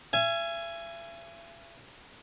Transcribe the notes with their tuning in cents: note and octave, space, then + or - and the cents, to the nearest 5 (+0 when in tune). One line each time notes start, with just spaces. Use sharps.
E5 +40 G#5 +0